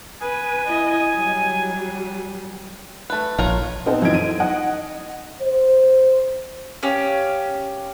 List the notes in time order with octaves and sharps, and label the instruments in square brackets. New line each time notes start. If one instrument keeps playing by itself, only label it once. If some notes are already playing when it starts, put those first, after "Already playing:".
[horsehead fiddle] B4 [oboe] G#5
[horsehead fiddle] E4 D#5
F#3 G3
[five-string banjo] A3 B4
[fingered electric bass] A#1 [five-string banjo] F4 A#4 C#5
[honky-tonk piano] B3 C4 D#4 A4 C5
F#2 E3 F3 D#4 G#6 D7
D#7
D#4 D#5 F#5
[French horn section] C5
[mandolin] C#4 G4 F5